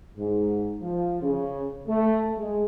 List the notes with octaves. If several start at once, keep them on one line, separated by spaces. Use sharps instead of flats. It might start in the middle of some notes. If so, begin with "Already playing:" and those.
G#2
F3
C#3
A3
G#3